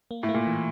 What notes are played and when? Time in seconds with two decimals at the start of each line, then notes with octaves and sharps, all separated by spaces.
0.11 A#3
0.23 A2
0.29 A#3
0.34 A#2
0.47 E3